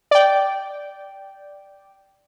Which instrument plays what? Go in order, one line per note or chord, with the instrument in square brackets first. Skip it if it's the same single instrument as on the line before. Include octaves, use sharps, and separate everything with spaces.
[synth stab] D5 G5